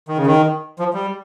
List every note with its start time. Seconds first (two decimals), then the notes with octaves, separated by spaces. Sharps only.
0.08 D#3
0.17 C#3
0.26 D#3
0.79 F3
0.94 G3